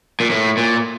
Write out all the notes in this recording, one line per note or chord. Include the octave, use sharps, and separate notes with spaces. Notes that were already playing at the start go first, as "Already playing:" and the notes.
A#2
A2
A#2